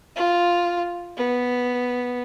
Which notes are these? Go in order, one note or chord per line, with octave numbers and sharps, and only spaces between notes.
F4
B3